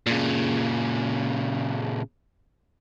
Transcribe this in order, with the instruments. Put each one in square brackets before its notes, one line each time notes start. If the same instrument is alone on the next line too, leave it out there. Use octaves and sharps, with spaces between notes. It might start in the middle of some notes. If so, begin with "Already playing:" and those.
[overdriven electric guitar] A#2 C#3